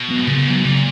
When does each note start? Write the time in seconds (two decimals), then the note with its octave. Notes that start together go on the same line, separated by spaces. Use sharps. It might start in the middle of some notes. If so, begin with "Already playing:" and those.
Already playing: B2
0.08 F#3 B3
0.16 G#2
0.27 A#2 C#3
0.45 G#2 F#3 B3
0.64 A#2 C#3